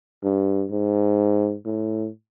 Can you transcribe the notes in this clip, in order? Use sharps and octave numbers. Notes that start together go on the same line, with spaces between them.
G2
G#2
A2